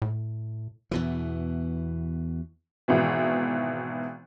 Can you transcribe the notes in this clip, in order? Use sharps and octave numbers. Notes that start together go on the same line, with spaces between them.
A2
E2 B2 E3
G#1 B2 E3